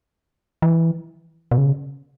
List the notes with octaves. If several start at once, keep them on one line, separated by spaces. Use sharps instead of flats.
E3
B2
C#3